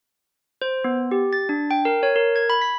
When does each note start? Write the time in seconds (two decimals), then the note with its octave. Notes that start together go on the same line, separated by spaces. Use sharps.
0.62 C5
0.84 B3
1.11 G4
1.33 A6
1.49 D4
1.71 G5
1.85 A#4
2.03 C#5
2.16 A#4
2.36 G#6
2.50 B5
2.61 B6